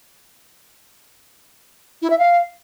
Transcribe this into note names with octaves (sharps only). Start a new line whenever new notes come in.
E4
E5
F5